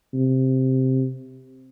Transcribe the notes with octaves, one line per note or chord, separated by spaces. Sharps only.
C3